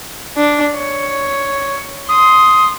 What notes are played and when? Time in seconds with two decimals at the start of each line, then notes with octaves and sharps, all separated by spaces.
0.37 D4
0.77 C#5
2.09 C6 D#6